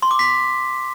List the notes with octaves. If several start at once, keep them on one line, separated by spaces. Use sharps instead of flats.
C6
D6
B6